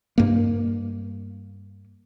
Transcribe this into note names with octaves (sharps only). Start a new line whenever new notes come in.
G2 A#3